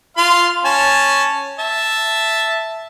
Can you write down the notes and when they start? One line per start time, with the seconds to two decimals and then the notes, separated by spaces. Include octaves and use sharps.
0.17 F4 F5 C6
0.65 C#4 G#5 A5
1.59 E5 A5